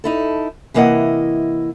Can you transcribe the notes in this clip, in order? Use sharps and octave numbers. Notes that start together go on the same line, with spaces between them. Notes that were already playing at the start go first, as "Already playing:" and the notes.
D#4 E4 A4
C3 E3 A#3 E4 D#5 F#5